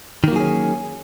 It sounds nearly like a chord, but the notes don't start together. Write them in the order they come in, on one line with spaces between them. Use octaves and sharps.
D#3 A#3 F#3 G#4 C#4